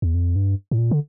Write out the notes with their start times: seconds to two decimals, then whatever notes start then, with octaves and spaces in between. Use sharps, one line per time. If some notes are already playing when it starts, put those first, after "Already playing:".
0.02 E2
0.14 F2
0.36 G2
0.71 A2
0.78 A#2
0.91 D3